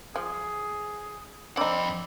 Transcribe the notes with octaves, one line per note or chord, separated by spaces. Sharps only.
F3 G#4
F2 C4 D4 D#4 B5